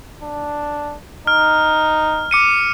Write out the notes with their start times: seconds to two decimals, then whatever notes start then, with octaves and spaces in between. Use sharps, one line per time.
0.23 D4
1.27 D#4 F6
2.31 D6 C#7 D#7